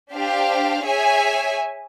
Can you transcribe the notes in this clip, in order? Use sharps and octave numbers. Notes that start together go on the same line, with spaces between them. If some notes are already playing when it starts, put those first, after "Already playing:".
D4 G4 C5 F5
G#4 C#5 E5 G#5